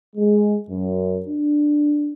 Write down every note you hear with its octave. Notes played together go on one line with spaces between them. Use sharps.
G#3
F#2
D4